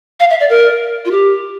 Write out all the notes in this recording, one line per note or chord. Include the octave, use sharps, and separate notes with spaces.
F5
E5
D5
A#4
F4
G4